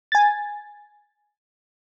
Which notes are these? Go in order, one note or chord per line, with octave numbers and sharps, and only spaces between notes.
G#5 A6